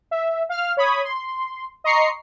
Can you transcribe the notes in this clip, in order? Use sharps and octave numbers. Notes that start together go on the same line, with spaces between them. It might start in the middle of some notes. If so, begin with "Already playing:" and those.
E5
F5 F6
C#5 B5 D#6 G#6
C6
D#5 A#5 C6 C#6 C7 C#7